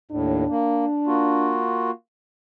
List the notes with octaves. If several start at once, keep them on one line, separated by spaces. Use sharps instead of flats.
D#2 A2 D4
A#3
A#3 F4 F#4